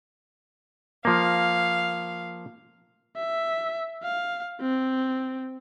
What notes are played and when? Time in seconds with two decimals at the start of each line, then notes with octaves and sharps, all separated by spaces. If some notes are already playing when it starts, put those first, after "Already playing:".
1.05 F3 A#3 F5
3.16 E5
4.03 F5
4.60 C4